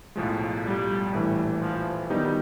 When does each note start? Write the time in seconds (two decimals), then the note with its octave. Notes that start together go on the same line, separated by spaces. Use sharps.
0.16 B1 A2 F3 G#3
0.64 G3
1.12 A#1 A2 E3 A3
1.61 F3
2.10 D#3 F#3 G3 B3 D#4 G4